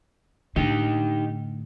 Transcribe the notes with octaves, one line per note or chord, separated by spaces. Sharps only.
A2 D3 D#4 G4